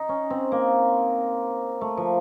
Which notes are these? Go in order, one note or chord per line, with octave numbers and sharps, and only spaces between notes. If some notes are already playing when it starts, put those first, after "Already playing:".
Already playing: D#4
C#4
C4
A#3
A3
F3